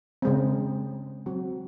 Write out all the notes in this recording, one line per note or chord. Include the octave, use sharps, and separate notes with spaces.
C#3 G#3 C4
F#3 C4 F#4